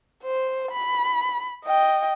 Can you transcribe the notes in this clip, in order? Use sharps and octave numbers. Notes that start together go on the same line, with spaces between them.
C5
B5
D#5 G5